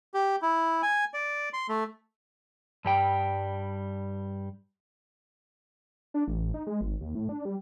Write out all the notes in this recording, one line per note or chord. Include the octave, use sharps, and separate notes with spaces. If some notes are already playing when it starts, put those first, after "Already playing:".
G4
E4
G#5
D5
C6
A3
G2 G3 G5
D4
A1
D#4
G#3
G#1
D#2
A2
D4
G3